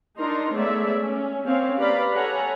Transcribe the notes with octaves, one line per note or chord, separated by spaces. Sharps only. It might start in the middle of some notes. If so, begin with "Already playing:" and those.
D4 D#4 A#4 A#5 C6
G#3 A3 B3 C#5 D5 E5
C#4
A#3 C4 C#4 C#5 F5
G4 B4 D5 F5 A#5 B5
A4 C#5 F#5 G#5 A#5 B5